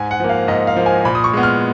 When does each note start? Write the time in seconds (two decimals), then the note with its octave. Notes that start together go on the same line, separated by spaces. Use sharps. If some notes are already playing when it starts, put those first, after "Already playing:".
Already playing: G#2 G#5
0.11 F#5
0.20 F3 A#3
0.29 F5
0.48 G#2 D#5
0.67 F5
0.76 F3 A#3
0.86 G#5
1.05 A#2 B5
1.15 D#6
1.24 C#6
1.33 G#3 B3
1.43 F6